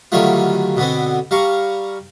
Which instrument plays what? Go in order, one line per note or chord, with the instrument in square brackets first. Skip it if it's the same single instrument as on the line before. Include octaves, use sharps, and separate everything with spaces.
[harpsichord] D3 D#3 F#3 G3 A3 F4
B2 D3 B3 C4
G3 F5 A#5 C#6